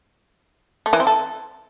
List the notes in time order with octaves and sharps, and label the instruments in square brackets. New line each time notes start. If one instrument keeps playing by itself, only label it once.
[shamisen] A3
E3
C4
A4